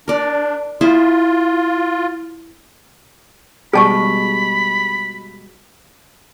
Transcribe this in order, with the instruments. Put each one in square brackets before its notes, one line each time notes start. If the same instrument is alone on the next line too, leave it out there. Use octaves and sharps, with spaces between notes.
[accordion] D4 [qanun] A#4 D5
[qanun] E4 G#4 C5 [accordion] F4
[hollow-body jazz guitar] B2 G3 G#3 [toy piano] G#4 A5 C#6 [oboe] B5